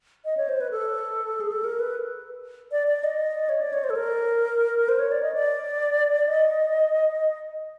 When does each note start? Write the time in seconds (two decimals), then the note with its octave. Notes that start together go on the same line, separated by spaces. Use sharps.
0.25 D#5
0.37 C#5
0.49 C5
0.61 B4
0.71 A4
1.40 G#4
1.52 A4
1.64 A#4
1.79 B4
2.72 D5
2.87 D5
3.04 D#5
3.49 C#5
3.61 D5
3.73 C#5
3.84 C5
3.90 A4
3.95 A#4
4.89 C5
4.99 C#5
5.11 D5
5.22 D#5
5.34 D5
6.27 D#5